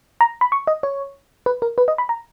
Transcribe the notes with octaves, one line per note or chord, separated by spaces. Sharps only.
A#5
B5
C#6
D#5
C#5
B4
A#4
B4
D#5
B5
A#5